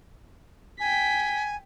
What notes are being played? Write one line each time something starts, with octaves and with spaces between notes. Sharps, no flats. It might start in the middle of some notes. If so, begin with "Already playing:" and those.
G5 G#5 B6